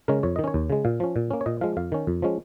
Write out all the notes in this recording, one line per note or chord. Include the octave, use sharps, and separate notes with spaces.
C#3 G#3 C#4 A#4
F2 C#5
D#3 D#5
C#4 C#5
D#2
C#3 G#3
A#2 F5
F3 C#4
A#2
A#3 C#4
C#5
A#2 D#5
F3 G#3 F5
F2 F5
D#3 C#4
F2
F3 G#3 C#4